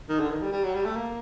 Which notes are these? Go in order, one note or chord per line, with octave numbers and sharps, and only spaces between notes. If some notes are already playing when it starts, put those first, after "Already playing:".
D#3
D3
D#3
G3
G3
F#3
G3
A3
A#3